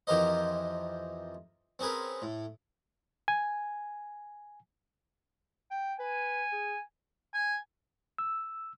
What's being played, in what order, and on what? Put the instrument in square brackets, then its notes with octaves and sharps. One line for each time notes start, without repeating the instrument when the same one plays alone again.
[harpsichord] F2 E3 G4 A#4 C5 D#5
C4 C#4 G#4 A#4 B4
A2
[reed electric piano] G#5
[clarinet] G5
[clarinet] B4 [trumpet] G#5
[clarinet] G#4
[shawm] G#5
[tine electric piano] E6